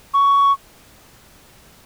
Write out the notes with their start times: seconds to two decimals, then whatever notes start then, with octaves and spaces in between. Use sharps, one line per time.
0.14 C#6